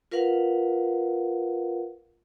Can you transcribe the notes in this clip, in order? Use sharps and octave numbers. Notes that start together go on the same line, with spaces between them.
F4 A#4 B4 F5 F#5